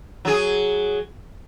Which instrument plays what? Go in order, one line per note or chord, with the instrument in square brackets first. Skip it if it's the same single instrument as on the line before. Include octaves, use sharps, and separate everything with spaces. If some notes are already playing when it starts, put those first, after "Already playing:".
[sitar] F#3 G#4